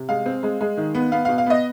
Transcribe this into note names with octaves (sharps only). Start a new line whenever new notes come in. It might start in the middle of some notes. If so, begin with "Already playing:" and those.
Already playing: C3
G#3 F5
C4
G#3
G#3
D#3
B3
B3 F5
B2 F5
F5
B3 D#5